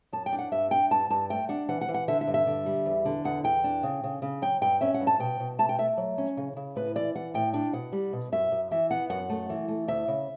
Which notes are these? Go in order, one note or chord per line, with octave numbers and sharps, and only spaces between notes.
F#2 A5
G5
D4
F#5
G2 E5
D4 G5
G2 A5
G2 A5
A3 G5
D4 F#5
E3 F#5
F#5
E3
F#5
D3 E5
E5
G2
E5
D3
G3
E2
D3
E2 F#5
E2 G5
D4
C#3
C#3
C#3
F#3 G5
G2 G5
C#4 E5
F#5
G2
A5
B2 G5
B2
A3 A5
G5
A3 E5
F#3
C#4
C#3
C#3
A2 B4
E3 D5
E3 F#5
A2 G5
D4 G5
B2 F#5
G3
B2
F#2 E5
F#2
E3 E5
B3 F#5
F#2 F#5
A3
E3
A3
D2 E5
C#3